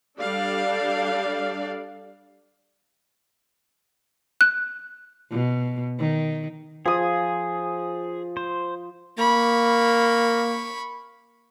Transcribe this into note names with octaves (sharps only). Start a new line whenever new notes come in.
G3 D4 A4 D5 F5
F#6
B2
D#3
F3 G#4 D#6
C5
A#3 B5 C#6